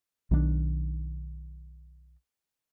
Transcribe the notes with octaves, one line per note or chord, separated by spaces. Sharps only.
B1 D#3 E3 D4